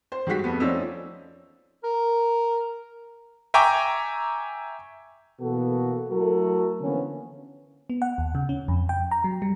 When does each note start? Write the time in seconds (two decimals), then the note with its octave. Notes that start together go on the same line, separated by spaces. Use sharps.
0.12 C5
0.27 D#3 G3 G#3 F#4 B6
0.44 F2 A3 B3
0.60 F3 C#4 D#4 D5 E6
1.84 A#4
3.54 E5 G5 G#5 A#5 C#6 D6
5.41 B2 E3 A#3 B3 F#4 A4
6.10 F#3 A3 E4 F#4 A4 A#4
6.81 D3 E3 F3 A#3 B3 C#4
7.90 B3
8.02 F#5
8.18 D#2
8.35 C#3
8.49 C#4
8.68 F2
8.89 G5
9.11 A#5
9.24 F#3
9.42 G3